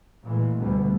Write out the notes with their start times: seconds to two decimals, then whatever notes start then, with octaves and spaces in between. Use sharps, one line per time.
0.23 A#2 E3 G#3 A3
0.60 D2 B2 D3 G3 A3 B3